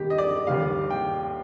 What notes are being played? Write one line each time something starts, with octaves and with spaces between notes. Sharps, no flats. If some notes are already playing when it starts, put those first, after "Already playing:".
Already playing: D#2 D#3 G3 G4
D#5
D5
D#2 D#3 G3 F5
G5